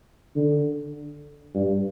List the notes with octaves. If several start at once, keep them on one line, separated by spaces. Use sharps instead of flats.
D3
G2